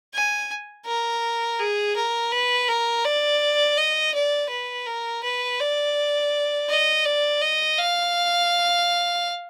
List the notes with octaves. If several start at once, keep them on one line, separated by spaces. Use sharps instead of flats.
G#5
A#4
G#4
A#4
B4
A#4
D5
D#5
D5
B4
A#4
B4
D5
D#5
D5
D#5
F5